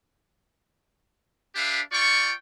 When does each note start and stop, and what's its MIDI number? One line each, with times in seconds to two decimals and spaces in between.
1.55 1.80 62
1.55 1.80 67
1.55 1.80 71
1.55 1.80 76
1.55 1.80 77
1.92 2.32 65
1.92 2.32 74
1.92 2.32 79
1.92 2.32 85